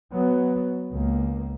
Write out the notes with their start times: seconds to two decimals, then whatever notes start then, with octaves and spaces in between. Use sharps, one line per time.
0.13 F#3 B3
0.92 C#2 A#3